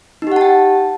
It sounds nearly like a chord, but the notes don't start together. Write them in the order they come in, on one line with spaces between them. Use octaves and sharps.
D#4 G4 F#5 A5 G5